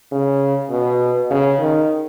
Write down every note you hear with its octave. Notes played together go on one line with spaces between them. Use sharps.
C#3
B2
C#3
D#3